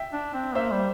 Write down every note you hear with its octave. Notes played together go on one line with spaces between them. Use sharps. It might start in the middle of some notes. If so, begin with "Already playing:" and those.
Already playing: E5 G5
D4
C4
A#3 C5 E5
G3